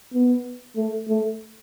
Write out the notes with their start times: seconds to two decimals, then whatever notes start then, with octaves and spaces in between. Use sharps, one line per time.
0.14 B3
0.77 A3
1.08 A3